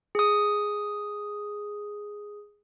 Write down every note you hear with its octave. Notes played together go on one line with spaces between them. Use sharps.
G#4 D#6